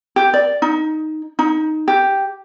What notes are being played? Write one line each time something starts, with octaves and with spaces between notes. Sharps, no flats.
G4
D5
D#4
D#4
G4